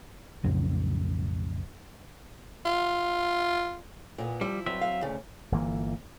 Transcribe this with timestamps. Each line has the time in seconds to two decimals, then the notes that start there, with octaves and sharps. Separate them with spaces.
0.44 B1 F2 A2 C#3
2.66 F4
4.18 A#2 B3
4.41 F3 G3 E4
4.66 G2 F#3 C4 E5
4.81 F5
5.01 D2 C#3
5.52 G1 E3 A#3